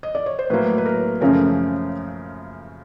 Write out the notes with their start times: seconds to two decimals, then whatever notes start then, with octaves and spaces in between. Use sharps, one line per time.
0.03 D#5
0.15 D5
0.26 C#5
0.39 C5
0.50 A2 F#3 A#3 B4
0.78 B4
0.86 A#4
1.21 F#2 C#3 F3 A3 C#4 A#4